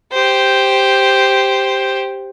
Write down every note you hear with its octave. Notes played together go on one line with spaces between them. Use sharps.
G4 C5